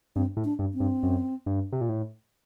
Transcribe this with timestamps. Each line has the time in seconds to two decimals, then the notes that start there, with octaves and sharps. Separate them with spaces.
0.16 G2 C4
0.37 A2
0.44 D4
0.59 G2
0.74 C4
0.80 G2
1.03 F#2
1.46 G2
1.73 C3
1.81 A#2
1.89 A2